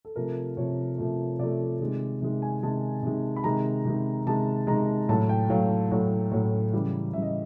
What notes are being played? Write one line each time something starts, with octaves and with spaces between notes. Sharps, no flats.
A4
C3 F3 A3 A#4
C3 F3 A3 C#5
C3 F3 A3
C3 F3 A3 D5
C3 D#3 G#3
C3 D#3 G#3
G#5
C3 D#3 G#3 A5
C3 D#3 G#3
B5
C3 D#3 G#3 A#5
C3 D#3 G#3
C3 D#3 G#3 A5
C3 D#3 G#3 A#5
A2 F#3 A3 A5
G5
A2 F#3 A3 F5
A2 F#3 A3
A2 F#3 A3
C#3 E3 G3
C#3 E3 G3 E5
D#5